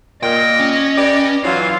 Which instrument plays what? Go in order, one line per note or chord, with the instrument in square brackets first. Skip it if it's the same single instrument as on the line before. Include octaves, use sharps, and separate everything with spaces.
[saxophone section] A#2 [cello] D#5 [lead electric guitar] G5
[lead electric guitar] C#4
[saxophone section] G4 B4 D5
[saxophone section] E3 F#3 [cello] F4